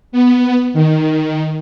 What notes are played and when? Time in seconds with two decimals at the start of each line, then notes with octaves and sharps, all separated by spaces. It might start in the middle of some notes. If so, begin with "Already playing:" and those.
0.12 B3
0.73 D#3